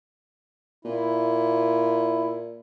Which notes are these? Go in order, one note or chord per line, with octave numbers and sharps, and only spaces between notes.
A#2 E4